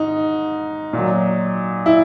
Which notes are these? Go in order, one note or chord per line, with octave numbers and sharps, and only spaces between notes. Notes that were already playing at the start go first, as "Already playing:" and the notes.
Already playing: G#2 D#4
A#2
F#3
E4